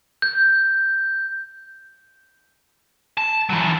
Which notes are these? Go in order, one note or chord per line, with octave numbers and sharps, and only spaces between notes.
G6
A5
E3 F#3